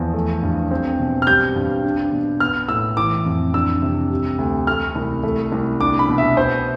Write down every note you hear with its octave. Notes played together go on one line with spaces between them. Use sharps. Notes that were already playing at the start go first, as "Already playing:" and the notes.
Already playing: E2 F3
A3
G2
C4
B2
F6
G3 G6
G2
D4
B2
B3 F6
A2 E6
E3 D6
F2
D4 E6
C3
G3
D2
A3 F6
C2
A3
C2
D4 D6
B5
B2
E5
B3 C5